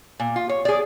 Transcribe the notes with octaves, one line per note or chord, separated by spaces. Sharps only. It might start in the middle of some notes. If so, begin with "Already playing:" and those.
A#2
F4
C#5
G#4 D5